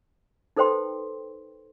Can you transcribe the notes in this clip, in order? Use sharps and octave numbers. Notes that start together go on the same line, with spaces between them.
D#4 A4 B4 C5 G5 C6